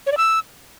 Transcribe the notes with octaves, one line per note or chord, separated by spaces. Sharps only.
C#5
D5
E6